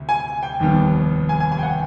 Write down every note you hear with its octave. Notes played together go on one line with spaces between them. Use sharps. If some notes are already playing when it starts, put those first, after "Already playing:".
Already playing: D2 C3
G#5
G5
F1 D#2 D#3 G3 B3
G#5
G#5
G#5
G5
F#5